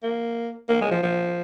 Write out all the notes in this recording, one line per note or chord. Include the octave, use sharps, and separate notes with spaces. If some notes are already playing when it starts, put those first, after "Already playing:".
A#3
A#3
G#3
F3
F3